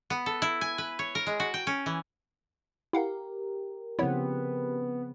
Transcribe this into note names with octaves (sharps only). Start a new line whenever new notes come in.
B3
A4
E4
G#5
B4
C#5
A#4
G#3
F#4
G5
C#4
E3
E4 G4 A#4 F5 F#5
C#3 F3 B3 C4 E4 C#5